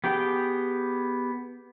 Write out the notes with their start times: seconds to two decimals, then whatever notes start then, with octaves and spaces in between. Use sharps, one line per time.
0.04 B3 G4 G#4 G5